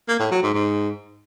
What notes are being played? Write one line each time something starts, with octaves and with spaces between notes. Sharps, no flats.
A#3
A2
F#3
G#2
G#2